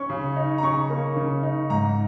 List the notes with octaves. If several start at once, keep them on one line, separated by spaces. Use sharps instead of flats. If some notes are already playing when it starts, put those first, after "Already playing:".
Already playing: C#4 C#6
C#3
D#4
A#5
C#3 C#6
A#3
C#3
D#4
G#2 A#5